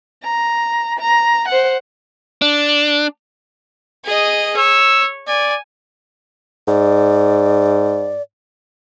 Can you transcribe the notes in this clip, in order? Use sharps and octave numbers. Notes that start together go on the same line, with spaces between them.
A#5
A#5
C5 F#5
D4
G#4 D#5
C#5 E6
D5 G#5
G#2 D5